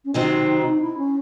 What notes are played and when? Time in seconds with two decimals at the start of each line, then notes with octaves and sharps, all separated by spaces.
0.05 C#4
0.14 C3 D#3 F#3 C4 D#4
0.80 E4
0.97 C#4